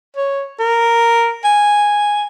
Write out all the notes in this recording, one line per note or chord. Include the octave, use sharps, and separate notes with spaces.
C#5
A#4
G#5